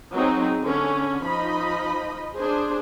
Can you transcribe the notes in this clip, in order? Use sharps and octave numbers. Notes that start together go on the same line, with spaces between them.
F#3 C4 D#4 G#4
D3 C#4
F3 D#4 D#5 B5
D4 G#4 C5